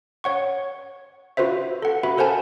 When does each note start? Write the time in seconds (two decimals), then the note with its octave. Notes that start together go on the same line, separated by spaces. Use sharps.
0.24 C#5 F#5 C#6
1.37 F4 F#4 B4 C5 E5
1.82 A4 F#5
2.03 F#4 B4 E5 B5
2.17 A4 A#4 C5 F#5 G#5 A5